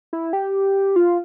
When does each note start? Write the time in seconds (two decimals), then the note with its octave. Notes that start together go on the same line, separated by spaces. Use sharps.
0.13 E4
0.33 G4
0.96 F4